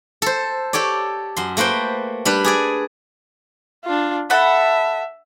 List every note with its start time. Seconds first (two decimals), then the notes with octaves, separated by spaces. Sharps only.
0.22 A4 C5
0.73 G4 A4 C#5 D5
1.37 F#2 C6
1.57 A3 A#3 B4 C5 G5
2.25 G3 D4 B4
2.44 G#4 D5 G#5
3.85 D4 F4
4.30 A4 E5 F#5 B5